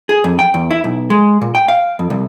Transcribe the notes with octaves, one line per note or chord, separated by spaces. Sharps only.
G#4
F2
G5
E2
E4
B1
G#3
A#2
G5
F5
F2
C2